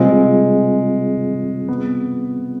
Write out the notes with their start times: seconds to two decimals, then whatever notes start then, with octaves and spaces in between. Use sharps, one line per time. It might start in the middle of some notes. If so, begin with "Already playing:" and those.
Already playing: C3 G3 G#3 C4 F4 G#4
1.68 B3